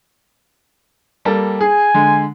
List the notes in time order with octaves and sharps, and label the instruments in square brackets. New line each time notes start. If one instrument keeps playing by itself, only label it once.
[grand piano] G3 A#3 A4
[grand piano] G#4 [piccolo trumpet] G#5
[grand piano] D3 G#3